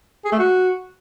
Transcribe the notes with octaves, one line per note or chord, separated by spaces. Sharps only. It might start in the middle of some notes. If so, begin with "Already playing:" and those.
G#4
A3
F#4